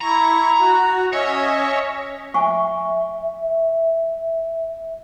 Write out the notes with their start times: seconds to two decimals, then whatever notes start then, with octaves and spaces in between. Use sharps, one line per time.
0.01 E4 A#5 C#6
0.61 F#4
1.13 C#4 C#5 D#5 E5
2.34 E5 G#5 C#6